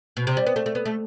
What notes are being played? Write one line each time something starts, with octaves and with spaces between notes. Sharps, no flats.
B2
C3
G3
B3
A3
A3
B3
A3